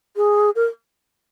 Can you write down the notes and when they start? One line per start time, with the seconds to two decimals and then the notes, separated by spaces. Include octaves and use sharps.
0.16 G#4
0.56 A#4